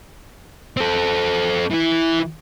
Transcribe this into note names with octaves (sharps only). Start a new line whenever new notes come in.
C4 A4
E3 E4